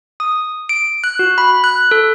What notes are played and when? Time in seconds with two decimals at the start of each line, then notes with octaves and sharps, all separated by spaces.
0.20 D#6
0.69 D7
1.04 F#6
1.19 F#4
1.38 B5
1.64 F#6
1.91 A4